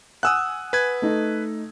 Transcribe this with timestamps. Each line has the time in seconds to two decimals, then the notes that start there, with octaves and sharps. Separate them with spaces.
0.23 F#5 G#5 D#6 E6 F#6
0.73 B4 G#6
1.02 A3 D#4 A4